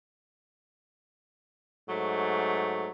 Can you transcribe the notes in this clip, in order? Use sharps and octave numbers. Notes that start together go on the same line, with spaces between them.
G#2 F#3 A3